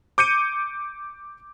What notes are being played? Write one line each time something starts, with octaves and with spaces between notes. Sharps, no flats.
D6 G6 C#7 D#7